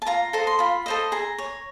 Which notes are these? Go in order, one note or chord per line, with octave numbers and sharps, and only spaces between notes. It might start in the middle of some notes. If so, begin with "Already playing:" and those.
A5
F4 A#5
A4 C5 D#5
C6
F4 B5
A4 C5 D#5
G#4 A#5
C#5